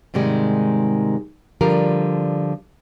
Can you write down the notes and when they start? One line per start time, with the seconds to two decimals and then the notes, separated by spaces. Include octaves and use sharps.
0.14 G#2 C3 D#3 G3 G#3
1.61 D3 F3 G3 A#4